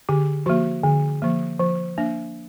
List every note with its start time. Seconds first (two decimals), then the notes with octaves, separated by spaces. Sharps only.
0.09 D3 G4
0.46 F3 A#3 F#4
0.84 D3
1.22 F3 A#3
1.59 F3
1.98 A#3 D4